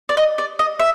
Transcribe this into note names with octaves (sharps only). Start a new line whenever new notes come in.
D5
D#5
D5
D#5
E5